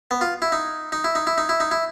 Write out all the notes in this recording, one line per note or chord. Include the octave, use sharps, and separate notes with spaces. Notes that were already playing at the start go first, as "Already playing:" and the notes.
B3
F4
E4
D#4
D#4
E4
D#4
E4
D#4
E4
D#4
E4